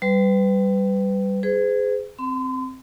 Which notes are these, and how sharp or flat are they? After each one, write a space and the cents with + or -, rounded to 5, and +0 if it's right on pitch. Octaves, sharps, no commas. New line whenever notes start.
G3 -10 B4 +25
G#4 +0 C5 -45
C4 +0 C6 -40